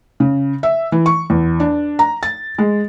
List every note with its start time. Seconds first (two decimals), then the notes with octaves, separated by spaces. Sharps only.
0.20 C#3
0.63 E5
0.92 E3
1.06 C#6
1.30 E2
1.60 D4
1.99 A#5
2.23 A6
2.58 G#3